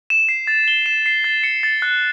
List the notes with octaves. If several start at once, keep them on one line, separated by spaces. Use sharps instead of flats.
E7
C7
A6
G7
E7
C7
A6
C#7
A6
F#6